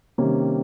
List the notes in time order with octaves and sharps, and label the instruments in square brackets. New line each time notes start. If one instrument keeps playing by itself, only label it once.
[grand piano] C3 D#3 G3 A#3 C#4